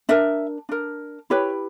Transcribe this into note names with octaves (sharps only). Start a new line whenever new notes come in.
D4 A#4 E5
D4 A#4
E4 G4 B4 C#5